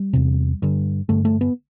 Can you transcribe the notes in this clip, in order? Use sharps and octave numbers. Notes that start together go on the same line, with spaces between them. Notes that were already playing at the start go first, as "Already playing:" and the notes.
Already playing: G3
E2 C3
G2 D3
G2 D3 A3
A3
B3